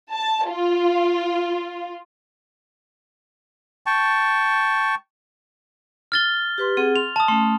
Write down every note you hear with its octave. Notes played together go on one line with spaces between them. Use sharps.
A5
F4
G5 A5 C#6
F6 A6 G7
G4 B4 C6
C4 G#4 F#5
C6 F7
A5 D#6
A3 C#4 C6